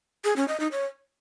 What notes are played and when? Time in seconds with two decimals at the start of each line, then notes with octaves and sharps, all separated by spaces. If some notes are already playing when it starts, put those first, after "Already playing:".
0.25 G#4
0.36 C#4
0.48 D#5
0.60 D#4
0.72 C#5